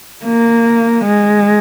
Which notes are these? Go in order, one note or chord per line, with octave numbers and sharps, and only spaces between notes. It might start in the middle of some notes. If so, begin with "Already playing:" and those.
A#3
G#3